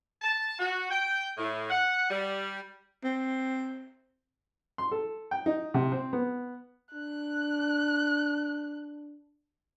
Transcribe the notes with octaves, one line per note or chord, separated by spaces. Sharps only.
A5
F#4
G5
A2
F#5
G3
C4
C6
A4
G5
D#4
C3
C4
B3
D4 F#6